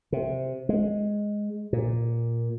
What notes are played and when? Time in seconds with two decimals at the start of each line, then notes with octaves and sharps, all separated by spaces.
0.12 C3
0.69 G#3
1.73 A#2